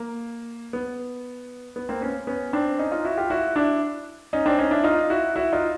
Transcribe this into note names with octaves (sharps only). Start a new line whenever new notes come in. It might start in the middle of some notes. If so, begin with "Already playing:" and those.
Already playing: A#3
B3
B3
A#3 C4
B3 C#4
B3 C#4
C4 D4
C#4 D#4
D#4 F4
E4 F#4
F4 G4
E4 F#4
D4 E4
C#4 D#4
C4 D4
C#4 D#4
D4 E4
D#4 F4
E4 F#4
E4 F#4
D#4 F4